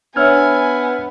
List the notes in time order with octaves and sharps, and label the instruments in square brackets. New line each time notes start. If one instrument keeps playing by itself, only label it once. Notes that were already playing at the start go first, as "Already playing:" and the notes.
[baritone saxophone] B3 [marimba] D4 C#5 E5 [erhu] G#5 [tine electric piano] E6 F6 G#6